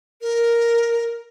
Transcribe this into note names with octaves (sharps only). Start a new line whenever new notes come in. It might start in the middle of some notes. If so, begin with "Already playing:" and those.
A#4